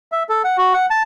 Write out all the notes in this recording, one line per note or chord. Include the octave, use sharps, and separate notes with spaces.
E5
A4
F#5
F#4
F#5
A5